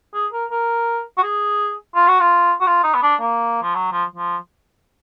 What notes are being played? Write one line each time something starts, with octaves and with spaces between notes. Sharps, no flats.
G#4
A#4
A#4
F#4
G#4
F4
F#4
F4
F#4
F4
D#4
B3
D4
A#3
F3
F#3
F3
F3